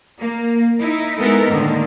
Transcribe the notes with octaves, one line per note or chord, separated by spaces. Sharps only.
A#3
D#4 E4
G#3 B3 D#4 E4 A4 A#4
A2 D3 D#3 A#3